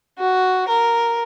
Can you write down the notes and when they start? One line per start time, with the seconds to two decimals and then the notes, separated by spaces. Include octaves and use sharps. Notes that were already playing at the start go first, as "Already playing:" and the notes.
0.19 F#4
0.68 A#4